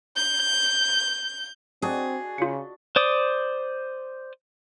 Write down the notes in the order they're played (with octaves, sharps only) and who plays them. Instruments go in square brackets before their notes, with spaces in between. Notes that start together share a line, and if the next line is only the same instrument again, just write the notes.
[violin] G6
[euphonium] C4 [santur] D4 F#4 D#5 [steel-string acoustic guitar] G#4
[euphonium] C#3 [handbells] F4 C#7
[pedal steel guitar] C5 D5 D#6